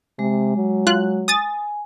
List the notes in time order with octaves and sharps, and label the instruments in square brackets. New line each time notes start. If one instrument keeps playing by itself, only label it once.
[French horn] C3 [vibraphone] G#3
[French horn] F#3
[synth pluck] F4 F#6
[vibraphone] G#5 [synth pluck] D#6 A6